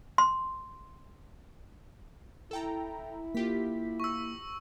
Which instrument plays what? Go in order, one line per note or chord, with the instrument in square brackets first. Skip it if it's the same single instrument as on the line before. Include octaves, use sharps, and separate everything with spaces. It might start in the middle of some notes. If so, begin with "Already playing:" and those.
[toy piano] C6
[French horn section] E4 [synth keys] A4 G5 A#5
[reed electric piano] A#3 [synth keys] F4 G4 B6
[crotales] C#6 E6